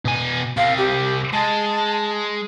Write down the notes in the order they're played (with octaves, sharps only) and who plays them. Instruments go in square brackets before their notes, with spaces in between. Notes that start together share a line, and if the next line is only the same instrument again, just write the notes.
[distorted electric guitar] B2 G#5
[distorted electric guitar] C2 C4 [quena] F5
[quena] G4
[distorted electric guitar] G#3 [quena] A5